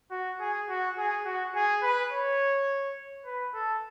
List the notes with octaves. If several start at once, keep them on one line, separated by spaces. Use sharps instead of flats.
F#4
G#4
F#4
G#4
F#4
G#4
B4
C#5
B4
A4